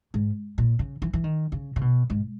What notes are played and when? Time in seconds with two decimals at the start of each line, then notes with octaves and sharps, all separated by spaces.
0.14 G#2
0.58 A#2
0.79 C#3
1.02 E3
1.13 E3
1.24 D#3
1.52 C#3
1.76 C#3
1.81 B2
2.10 G#2